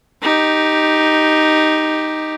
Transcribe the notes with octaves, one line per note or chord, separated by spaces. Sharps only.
D#4 G4